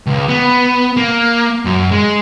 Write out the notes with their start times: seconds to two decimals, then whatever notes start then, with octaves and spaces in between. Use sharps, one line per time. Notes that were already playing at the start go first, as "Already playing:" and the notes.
0.07 C#2
0.29 B3
0.97 A#3
1.65 F#2
1.91 G#3